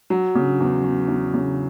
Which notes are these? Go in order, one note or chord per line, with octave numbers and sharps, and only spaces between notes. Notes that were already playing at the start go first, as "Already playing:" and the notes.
F#3
C#3
E2
E2
E2
C#3